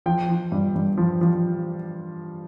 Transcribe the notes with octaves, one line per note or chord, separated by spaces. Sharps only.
F3 G5
F3
G2
G2
F3
F3